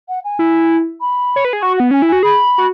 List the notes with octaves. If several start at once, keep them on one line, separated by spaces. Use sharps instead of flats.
F#5
G#5
E4
B5
C#5
B4
G#4
F#4 C#6
B3 F#5
C#4 G#5
E4
F#4 G#5
G#4 B5
F#4